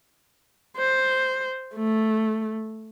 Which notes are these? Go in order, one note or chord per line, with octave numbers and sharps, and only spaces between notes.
C5
A3